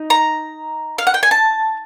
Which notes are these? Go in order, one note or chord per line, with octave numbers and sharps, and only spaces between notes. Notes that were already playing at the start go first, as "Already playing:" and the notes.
Already playing: D#4
A#5
F5
F#5
G5
G#5
A5